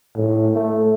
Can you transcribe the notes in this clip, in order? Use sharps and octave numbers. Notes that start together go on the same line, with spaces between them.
A2
A3